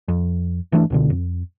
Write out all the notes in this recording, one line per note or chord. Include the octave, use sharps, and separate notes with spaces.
F2
G1 E3 A3 D4
C#2 B2 D3
F2